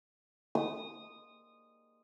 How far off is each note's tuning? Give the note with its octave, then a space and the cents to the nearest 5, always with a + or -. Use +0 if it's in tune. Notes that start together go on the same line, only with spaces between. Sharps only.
D#6 -10